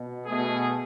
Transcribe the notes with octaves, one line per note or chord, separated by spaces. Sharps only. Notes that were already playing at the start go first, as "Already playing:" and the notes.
Already playing: B2
B2 A3 G#4